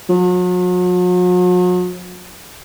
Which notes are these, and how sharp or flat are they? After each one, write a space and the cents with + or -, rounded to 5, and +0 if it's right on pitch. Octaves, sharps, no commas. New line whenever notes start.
F#3 -45